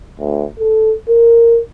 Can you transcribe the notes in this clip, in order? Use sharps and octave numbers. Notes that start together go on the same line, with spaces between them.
D2
A4
A#4